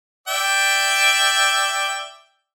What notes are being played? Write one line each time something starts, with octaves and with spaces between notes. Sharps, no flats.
D5 E5 G5